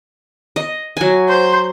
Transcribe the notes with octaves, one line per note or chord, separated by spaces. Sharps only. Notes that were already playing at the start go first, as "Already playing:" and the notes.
D#5
F#3 G#5
C5